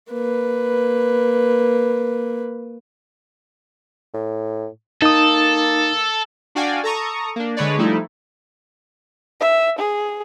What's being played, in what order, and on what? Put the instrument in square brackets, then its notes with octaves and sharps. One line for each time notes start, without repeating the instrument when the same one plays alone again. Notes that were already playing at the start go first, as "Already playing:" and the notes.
[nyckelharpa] A#3 B4
[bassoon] A2
[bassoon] A#3 [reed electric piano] D#4 D#6 [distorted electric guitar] A4
[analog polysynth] D4 F#4 D5 F5 G5 G#5
A4 A#5 C#6 D#6
A#3 D4
D3 G#3 B4 C#5 D5
F3 G3 A3 D#4 E4
[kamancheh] E5
G#4